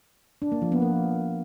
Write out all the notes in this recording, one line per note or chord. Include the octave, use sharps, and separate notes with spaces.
D4
A#3
F3
B3
A#3